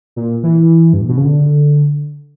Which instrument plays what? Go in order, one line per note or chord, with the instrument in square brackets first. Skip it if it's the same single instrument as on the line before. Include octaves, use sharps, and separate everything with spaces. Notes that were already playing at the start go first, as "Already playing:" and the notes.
[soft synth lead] A#2
E3
G2
A#2
B2
C#3
D3